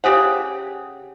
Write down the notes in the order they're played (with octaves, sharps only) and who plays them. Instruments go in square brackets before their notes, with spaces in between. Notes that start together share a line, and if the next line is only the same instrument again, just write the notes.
[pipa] C#3 G4 G#4 F#5